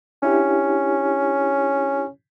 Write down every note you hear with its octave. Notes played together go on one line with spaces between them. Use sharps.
C#4 D4 E4 G4